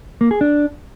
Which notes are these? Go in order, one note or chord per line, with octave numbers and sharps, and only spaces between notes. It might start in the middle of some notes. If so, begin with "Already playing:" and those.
A#3
G#4
D4